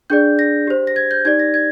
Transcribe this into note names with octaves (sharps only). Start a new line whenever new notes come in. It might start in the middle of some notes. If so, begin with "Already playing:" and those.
D4 G#4 D5 G6
A#6
G4 C5
A#6
G#6
G6
D#4 G4 D5 G#6
A#6
G#6